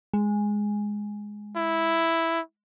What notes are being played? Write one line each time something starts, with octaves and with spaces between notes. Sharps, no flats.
G#3
E4